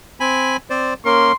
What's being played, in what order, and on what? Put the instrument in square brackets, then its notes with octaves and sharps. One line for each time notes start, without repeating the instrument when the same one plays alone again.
[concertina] C4 G#5 B5
C4 C5 D5
[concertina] A#3 C#4 A#4 [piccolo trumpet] C6